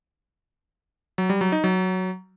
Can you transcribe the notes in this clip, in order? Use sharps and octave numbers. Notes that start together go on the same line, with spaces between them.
F#3
G3
F#3
D#4
F#3